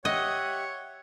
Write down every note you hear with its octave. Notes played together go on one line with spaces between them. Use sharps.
G4 C#5 D#5 E5 F#5